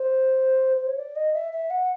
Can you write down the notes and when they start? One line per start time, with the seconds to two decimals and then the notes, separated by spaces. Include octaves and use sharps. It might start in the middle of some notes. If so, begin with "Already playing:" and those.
Already playing: C5
0.76 C5
0.87 C#5
0.97 D5
1.15 D#5
1.33 E5
1.52 E5
1.70 F#5